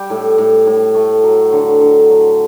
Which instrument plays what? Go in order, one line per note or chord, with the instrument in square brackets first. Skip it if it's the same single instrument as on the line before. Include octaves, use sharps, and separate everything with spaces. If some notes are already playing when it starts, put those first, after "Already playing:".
Already playing: [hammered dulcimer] G3 G5
A2
A2
A2
A3
F#3
D3
D3
F#3